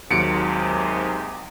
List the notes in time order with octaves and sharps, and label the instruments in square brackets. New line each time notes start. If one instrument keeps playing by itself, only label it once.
[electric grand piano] D#2 F#3 [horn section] G#2 C3 [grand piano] C#7 D7